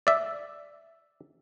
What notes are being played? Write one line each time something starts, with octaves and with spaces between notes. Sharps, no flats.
D5 E5